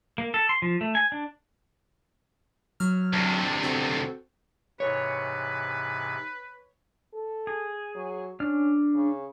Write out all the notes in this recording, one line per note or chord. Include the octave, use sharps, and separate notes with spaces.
A#3
A4
C6
F3
A3
G#5
D4
F#3 F6
D2 C3
C4 F#4 A4
G#2 C3 E3 B4 C#5
A4
G#4
F#3
C#4 D4 F6
C#3